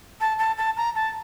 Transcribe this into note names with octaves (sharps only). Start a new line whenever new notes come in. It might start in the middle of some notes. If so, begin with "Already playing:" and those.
A5
A5
A5
A#5
A5